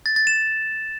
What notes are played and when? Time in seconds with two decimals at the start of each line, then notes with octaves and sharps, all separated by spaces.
0.06 A6
0.16 A6
0.27 E7